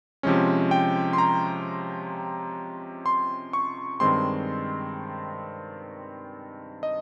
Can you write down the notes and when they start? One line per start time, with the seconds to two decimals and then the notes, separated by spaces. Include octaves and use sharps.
0.23 C3 F3 G#3 C#4
0.71 G5
1.13 C6
1.18 A#5
3.06 C6
3.53 C#6
4.00 G2 D#3 G#3 C4 C6
6.83 D#5